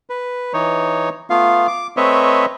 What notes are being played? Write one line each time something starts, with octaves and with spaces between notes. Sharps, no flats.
B4
E3 D#4 C#5
A3 B3 F4 F5
D6
A3 C4 B4 C#5 D#5 E5